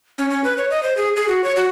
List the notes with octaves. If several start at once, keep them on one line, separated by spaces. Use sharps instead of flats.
C#4
C#4
B4
C#5
D#5
C5
G#4
G#4
F#4
C#5
F#4